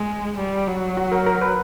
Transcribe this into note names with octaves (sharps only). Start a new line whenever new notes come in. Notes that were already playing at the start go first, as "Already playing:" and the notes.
Already playing: G#3
G3
F#3
F#4
A#4
A#4
B4